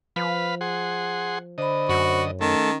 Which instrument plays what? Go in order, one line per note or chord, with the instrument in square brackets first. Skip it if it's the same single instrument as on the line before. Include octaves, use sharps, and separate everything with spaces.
[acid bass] F3 [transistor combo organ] B4 F5 B5
[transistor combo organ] G#4 F#5 C6
[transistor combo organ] D3 D#5 [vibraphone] C5 B5
[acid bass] F#2 [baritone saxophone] F#4
[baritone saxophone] D#3 [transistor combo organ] A3 A4 [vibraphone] C#4